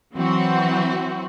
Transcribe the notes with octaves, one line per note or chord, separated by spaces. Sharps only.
E3 F#3 C4 F#4